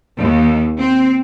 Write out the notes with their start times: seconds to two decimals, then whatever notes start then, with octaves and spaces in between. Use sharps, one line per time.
0.19 D#2
0.81 C4